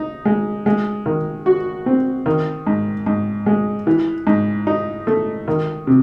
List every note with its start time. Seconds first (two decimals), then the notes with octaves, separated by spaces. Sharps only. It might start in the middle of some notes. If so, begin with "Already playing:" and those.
Already playing: D#4
0.25 G#3
0.66 G#3
1.06 D#3
1.46 F#4
1.86 C4
2.26 D#3
2.67 G#2
3.06 G#2
3.46 G#3
3.87 E3
4.27 G#2
4.67 D#4
5.07 A3
5.48 D#3
5.87 C3